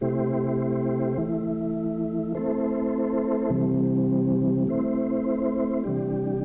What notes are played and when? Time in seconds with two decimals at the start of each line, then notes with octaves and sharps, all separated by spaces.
0.01 C3 A3 E4 G4 C5
1.18 E3 A3 E4
2.35 A3 C4 E4 A4 C5
3.50 C3 E3 G3 C4
4.67 A3 C4 E4 C5
5.84 C3 E3 G3 D4 G4